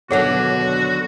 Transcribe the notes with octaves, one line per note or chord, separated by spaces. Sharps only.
D#2 B2 D3 F#3 F#4 G#4 C#5 F#5